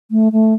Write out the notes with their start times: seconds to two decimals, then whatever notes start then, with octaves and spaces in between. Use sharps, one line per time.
0.11 A3
0.32 A3